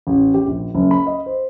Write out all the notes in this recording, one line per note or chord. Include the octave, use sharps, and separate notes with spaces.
A1
G4
A#1
F#1
B5
D#5
C5